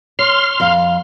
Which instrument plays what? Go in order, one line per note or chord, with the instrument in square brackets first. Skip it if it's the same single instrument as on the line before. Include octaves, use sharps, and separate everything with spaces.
[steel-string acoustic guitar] C#5 [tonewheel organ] C6 F6
[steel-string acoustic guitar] F2 F5